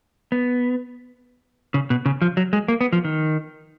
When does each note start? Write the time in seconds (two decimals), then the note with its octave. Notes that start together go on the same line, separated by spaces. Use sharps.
0.32 B3
1.74 C#3
1.90 B2
2.06 C#3
2.22 F3
2.37 F#3
2.53 G#3
2.68 A#3
2.81 B3
2.93 F3
3.05 D#3